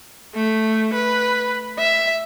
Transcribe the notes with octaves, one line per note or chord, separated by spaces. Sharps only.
A3
B4
E5